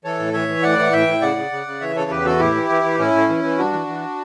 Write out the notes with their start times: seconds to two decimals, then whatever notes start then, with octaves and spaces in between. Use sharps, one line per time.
0.04 E3 A4 C#5
0.19 A2
0.33 E3 C#5 E5
0.48 E3
0.63 A2 D5 F#5
0.78 E3
0.92 A2 E5 G5
1.07 A2
1.21 C#3 D5 F#5
1.37 C#3
1.51 C#3
1.67 C#3
1.81 E3 C#5 E5
1.96 C#3 A4 C#5
2.10 E2 G4 B4
2.25 E3 F#4 A4
2.40 A2 E4 G4
2.55 E3
2.70 E3
2.84 E3
2.99 A2 C#4 E4
3.13 A2
3.29 E3
3.44 E3
3.58 G2 D4 F#4
3.73 E3
3.87 E3